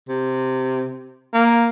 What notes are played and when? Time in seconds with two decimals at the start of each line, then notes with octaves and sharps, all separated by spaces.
0.09 C3
1.34 A#3